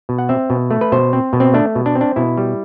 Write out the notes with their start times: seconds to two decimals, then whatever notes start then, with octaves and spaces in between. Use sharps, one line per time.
0.09 B2
0.18 F#5
0.29 C4 E5
0.50 B2
0.71 A3
0.81 B4
0.92 B2 C5
1.13 C4
1.33 B2
1.40 C4
1.54 A3 D4
1.75 B2
1.86 D4
1.95 C4
2.01 D4
2.16 B2 E4
2.37 G3